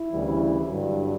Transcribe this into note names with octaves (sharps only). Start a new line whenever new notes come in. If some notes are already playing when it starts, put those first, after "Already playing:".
Already playing: E4
D2 C#3 E3 G3
G2 D3 F#3